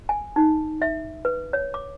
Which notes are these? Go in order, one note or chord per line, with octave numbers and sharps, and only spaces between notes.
G#5
D#4
E5
B4
C#5
D6